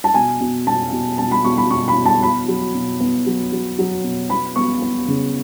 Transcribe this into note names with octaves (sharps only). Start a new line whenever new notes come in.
A5
B2 G#5
B2
B2 A5
B2
B2 A5
B5
B2 C#6
B5
B2 C#6
B5
B2
A5
B2 B5
F#3
B2
B3
F#3
F#3
F#3
B2
B3 B5
B3 C#6
B3
C#3